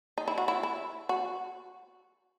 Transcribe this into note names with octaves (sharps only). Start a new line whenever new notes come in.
D#4
E4
F#4
E4
E4
F#4